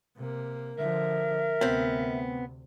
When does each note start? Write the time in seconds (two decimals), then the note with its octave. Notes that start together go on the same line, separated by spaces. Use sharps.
0.17 C3 A#3
0.78 D3 F3 A#4 E5
1.61 D2 C3 B3 C4